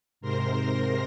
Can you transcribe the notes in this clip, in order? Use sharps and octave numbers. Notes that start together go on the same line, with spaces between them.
G#2 C3 A#4 C5 C6 A#6